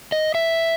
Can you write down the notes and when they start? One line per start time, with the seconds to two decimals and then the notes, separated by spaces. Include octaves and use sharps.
0.12 D#5
0.35 E5